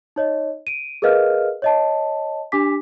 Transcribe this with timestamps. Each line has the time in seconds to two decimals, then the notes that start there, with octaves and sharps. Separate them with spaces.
0.16 D#4 C#5 D#5
0.67 D7 D#7
1.02 G#4 A#4 B4 D#5 F5 F6
1.62 C#5 D#5 A5
2.52 D4 G4 G#5 D6 B6